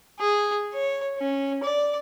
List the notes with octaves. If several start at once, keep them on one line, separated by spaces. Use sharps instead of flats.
G#4
C#5
C#4
D5